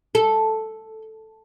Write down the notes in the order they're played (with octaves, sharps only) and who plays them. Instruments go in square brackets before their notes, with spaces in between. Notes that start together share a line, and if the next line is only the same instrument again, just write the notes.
[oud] A4